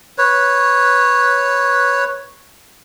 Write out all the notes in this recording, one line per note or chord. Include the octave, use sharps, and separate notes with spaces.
B4 C#5